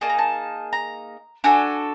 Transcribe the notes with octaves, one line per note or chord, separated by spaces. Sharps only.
A#3 D#4 G#4 A5
A#5
A5
A#5
D4 F#4 A4 G#5